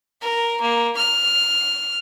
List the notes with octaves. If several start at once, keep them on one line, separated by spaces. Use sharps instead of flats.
A#4
A#3
F6